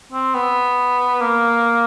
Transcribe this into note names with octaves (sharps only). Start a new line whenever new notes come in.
C4
B3
A#3